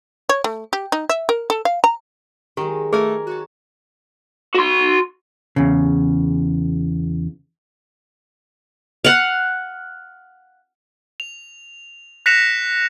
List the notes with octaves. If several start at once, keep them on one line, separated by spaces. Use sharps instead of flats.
C#5
A3
G4
D#4
E5
A#4
A4
F5
A#5
D#3 F#3 G#3 G4
A3 G#4 A#4 G#5
F#4 C#5 A5
F#4 C6
E2 C#3
F5 F#5
F7
F#6 A#6 B6 C#7 E7 F7